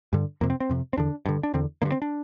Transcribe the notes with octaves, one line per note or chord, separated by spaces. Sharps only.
G2 D3
F2 C3 A#3
C4
C4
F2 C3
C4
E2 D3 D4
G2 D3
D4
E2 D3 C4
G2 D3 A#3
C4
D4